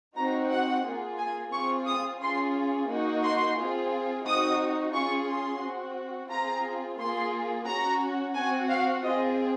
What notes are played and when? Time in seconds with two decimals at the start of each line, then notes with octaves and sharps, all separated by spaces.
0.16 C4 D#4 F#4 A#5
0.50 F#5
0.84 A#3 F4 G#4
1.19 G#5
1.52 C4 F4 G#4 C#6
1.87 D#6
2.21 C#4 F4 G#4 C6
2.90 A#3 D#4 F#4
3.23 C6
3.58 C4 F4 G#4
4.25 C4 D#4 F#4 D#6
4.94 C#4 F4 G#4 C#6
5.28 C6
5.62 C4 F#4
6.30 C4 F4 G#4 A#5
6.99 A#3 F4 G#4 C6
7.67 C#4 F#4 A#5
8.35 C4 F#4 G#5
8.70 F5
9.03 C4 F4 G#4 D#5